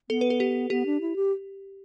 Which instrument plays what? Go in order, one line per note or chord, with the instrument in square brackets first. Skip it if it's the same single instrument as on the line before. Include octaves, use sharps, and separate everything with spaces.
[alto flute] B3 [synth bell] A4
[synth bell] B4
A4
G4
[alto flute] B3 [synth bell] G4
[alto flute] D4
E4
G4